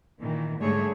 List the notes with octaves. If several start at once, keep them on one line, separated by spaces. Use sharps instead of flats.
A#2 D#3 E3
G#2 D3 G3 A3 G#4 C#5